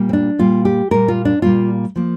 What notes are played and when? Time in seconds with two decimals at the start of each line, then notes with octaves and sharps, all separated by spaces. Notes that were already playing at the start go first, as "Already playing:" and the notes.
Already playing: A#2 G3 A#3
0.09 C4
0.13 D4
0.39 A#2 G3 A#3 F4
0.65 G4
0.91 A#2 G3 A#3 A#4
1.08 F4
1.25 D4
1.42 A#2 G3 A#3 F4
1.96 F3 A#3